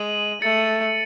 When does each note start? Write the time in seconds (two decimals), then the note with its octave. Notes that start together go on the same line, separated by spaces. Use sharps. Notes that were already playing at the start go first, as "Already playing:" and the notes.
Already playing: G#3 D#7 F#7
0.42 A3 A6 C#7